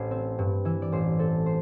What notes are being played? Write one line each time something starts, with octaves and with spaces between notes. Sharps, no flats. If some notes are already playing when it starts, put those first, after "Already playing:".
Already playing: A1 C5
C4
G2
E3 E5
D5
A1 C5
C4 A4
C5